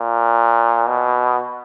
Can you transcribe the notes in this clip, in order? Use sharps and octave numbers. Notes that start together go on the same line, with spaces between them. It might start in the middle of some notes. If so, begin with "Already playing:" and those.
Already playing: A#2
B2